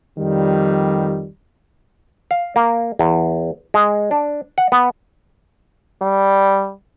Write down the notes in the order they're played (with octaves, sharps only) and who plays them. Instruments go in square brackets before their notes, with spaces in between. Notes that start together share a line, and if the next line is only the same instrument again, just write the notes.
[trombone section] F2 D#3 G3
[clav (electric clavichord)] F5
A#3
E2
G#3
D4
F#5
B3
[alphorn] G3